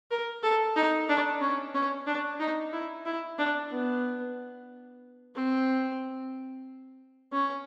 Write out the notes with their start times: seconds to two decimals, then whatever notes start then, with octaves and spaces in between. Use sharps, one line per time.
0.11 A#4
0.43 A4
0.76 D#4
1.09 D4
1.41 C#4
1.74 C#4
2.07 D4
2.40 D#4
2.73 E4
3.06 E4
3.39 D4
3.71 B3
5.35 C4
7.32 C#4